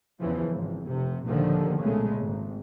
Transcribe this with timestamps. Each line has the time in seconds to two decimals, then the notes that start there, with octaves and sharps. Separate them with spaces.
0.19 E2 C#3 E3 F3
0.50 G#1
0.86 F1 C3
1.28 D#2 A#2 D3 D#3 F3
1.79 B1 A#2 C#3 G#3 A3
2.15 G#1